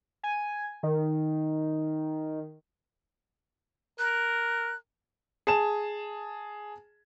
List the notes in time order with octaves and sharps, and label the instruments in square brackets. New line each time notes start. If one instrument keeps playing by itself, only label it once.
[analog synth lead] G#5
D#3
[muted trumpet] A#4 [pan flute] F#6
[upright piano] G#4 A5 E7